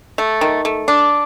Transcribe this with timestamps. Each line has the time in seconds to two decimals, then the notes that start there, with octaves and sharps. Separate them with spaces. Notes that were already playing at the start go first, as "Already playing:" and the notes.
0.18 A3
0.41 D#3
0.65 A3
0.88 D4